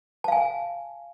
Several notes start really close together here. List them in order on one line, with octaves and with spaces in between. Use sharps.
A5 F5 G#5